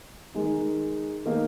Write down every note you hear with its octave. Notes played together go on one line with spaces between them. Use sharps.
D#3 G#3 D#4
D#3 A#3 D#4